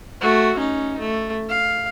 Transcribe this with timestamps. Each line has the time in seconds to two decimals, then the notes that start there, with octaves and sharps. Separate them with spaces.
0.21 A3 F#4
0.58 C#4 D#4
0.99 A3
1.49 F5